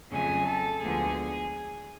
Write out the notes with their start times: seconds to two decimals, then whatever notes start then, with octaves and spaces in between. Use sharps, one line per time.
0.11 F2 C#3 F#3 A3 C#4 G#4 G#5
0.47 A4 A5
0.82 D2 D3 F3 G#3 B3 G#4 G#5